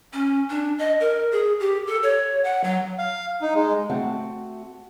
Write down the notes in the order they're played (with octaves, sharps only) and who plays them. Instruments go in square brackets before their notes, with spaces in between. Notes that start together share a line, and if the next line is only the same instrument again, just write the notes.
[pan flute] C#4
D4
D#5
A#4
G#4
G4
A4
C#5
F#5
F#3
[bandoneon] F5
D#4
G#3
[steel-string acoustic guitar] A3 C4 F#4 F#5 A5